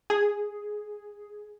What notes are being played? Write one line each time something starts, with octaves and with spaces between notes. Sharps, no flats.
G#4